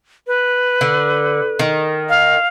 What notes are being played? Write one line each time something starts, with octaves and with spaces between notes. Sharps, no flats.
B4
D3
D#3
F5